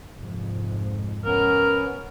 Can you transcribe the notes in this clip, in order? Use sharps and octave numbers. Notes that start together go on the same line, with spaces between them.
C2 F2 G#2
B3 C#4 A#4